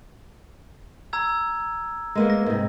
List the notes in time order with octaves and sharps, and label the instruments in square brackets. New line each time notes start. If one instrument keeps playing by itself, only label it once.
[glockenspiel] A#5 E6 G#6
[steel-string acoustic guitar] G#3 A#3 B3
[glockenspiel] A#6
[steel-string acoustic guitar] G#2 C3